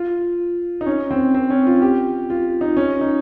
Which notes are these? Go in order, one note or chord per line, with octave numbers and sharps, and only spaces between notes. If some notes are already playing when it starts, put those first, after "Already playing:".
Already playing: F4
D#4
C#4
C4
C4
C#4
F4
G4
F4
D#4
C#4
D#4